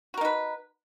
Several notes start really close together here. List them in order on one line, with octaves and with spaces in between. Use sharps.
F#4 A#4 D#4 B4